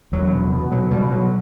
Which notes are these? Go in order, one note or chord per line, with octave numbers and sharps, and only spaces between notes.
E2 F#3
B2
B2
B2 F#3
B2 G3
B2 F#3